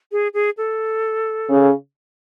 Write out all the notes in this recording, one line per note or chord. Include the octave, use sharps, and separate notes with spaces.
G#4
G#4
A4
C#3